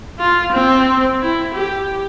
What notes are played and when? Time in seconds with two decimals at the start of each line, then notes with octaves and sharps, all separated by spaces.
0.19 F4
0.52 C4
1.21 E4
1.54 G4